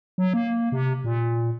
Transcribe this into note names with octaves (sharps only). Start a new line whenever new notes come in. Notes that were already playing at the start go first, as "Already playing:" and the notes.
F#3
A#3
C3
A#2